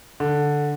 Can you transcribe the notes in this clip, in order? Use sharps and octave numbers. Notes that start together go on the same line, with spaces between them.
D3